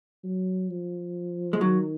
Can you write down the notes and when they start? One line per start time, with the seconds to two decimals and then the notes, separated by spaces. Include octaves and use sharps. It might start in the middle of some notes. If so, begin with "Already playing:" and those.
0.24 F#3
0.70 F3
1.53 G#3
1.61 D#3 F#3